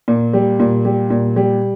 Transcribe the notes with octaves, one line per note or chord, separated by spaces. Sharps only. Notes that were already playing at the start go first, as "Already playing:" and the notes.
A#2
G3
A#2
G3
A#2
G3